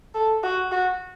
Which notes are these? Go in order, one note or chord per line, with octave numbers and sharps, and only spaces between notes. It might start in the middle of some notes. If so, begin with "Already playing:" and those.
A4
F#4
F#4